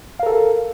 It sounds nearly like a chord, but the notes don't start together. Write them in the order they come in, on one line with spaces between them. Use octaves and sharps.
F5 A#4 A4